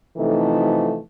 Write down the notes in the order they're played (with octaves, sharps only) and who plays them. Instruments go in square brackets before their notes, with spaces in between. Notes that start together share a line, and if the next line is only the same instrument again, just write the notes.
[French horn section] C3 E3 F3 A3 D#4 A4